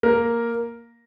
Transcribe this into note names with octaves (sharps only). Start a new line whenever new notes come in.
A#3 A#4